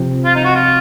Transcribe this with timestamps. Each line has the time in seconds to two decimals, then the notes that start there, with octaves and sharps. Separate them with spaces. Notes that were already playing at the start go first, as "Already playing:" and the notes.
Already playing: C3 F3 C4
0.25 F4
0.35 D#4
0.45 F#4
0.55 F4